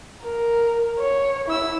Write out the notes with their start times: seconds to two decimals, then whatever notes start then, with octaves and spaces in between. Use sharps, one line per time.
0.24 A#4
0.99 C#5
1.48 E4 E6